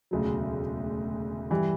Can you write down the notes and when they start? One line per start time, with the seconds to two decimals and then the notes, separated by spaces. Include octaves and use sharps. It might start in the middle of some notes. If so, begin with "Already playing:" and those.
0.11 E1 D2 C#3 F#3
1.50 G2 E3 G3